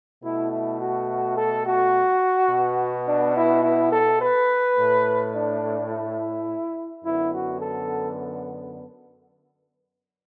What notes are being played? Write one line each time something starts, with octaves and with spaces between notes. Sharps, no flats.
B2 A3 E4
E4
F#4
A4
F#4
B2 B3
D4
E4
E4
A4
B4
A2 A3
D4
E4
F#2 D3 B3 E4
F#4
A4